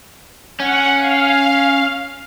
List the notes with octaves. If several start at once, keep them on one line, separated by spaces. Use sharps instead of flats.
C#4 F#5
F5